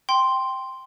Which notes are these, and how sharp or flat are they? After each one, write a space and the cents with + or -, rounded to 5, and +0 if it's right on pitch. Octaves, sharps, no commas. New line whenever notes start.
G5 +0 C6 +0